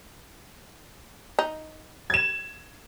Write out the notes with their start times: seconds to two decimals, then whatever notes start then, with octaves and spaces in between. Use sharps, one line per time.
1.39 D#4
2.10 G#6 E7